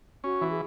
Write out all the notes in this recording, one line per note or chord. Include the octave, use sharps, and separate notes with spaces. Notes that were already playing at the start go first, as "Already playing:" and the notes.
C#4 F#4
E3
G#4